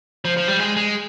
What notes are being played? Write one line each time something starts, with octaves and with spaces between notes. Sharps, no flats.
F3
F3
G3
G#3
G#3